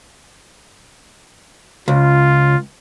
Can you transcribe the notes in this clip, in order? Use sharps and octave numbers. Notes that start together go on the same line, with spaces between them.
C#2 F4